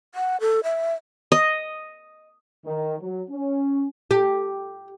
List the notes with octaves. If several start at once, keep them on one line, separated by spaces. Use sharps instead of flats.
F#5
A4
E5
D#5
D#3
F#3
C#4
G4